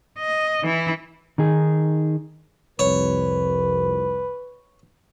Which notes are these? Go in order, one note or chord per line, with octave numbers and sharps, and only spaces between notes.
D#5
E3 E4
D#3 D#4 G#4
C2 F2 B4 C#5